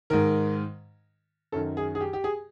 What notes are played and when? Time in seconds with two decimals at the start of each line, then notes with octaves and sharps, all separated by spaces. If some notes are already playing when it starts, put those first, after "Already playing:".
0.10 G#2 D#3 A#4
1.52 F#2 D#3 A4
1.77 G#4
1.95 G#4
2.01 G4
2.13 G4
2.24 G#4